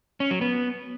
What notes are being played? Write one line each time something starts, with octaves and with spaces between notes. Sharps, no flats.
C#4
F#3
B3